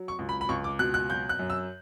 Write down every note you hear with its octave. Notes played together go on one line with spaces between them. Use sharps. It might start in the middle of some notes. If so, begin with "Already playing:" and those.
Already playing: F#3
C#6
C#2
B5
B5
C#2 C#6
D6
B2 F#6
F#6
F#3 G6
F#6
F#2
E6